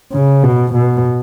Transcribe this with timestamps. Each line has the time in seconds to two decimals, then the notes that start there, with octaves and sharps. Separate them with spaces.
0.12 C#3
0.43 B2
0.74 B2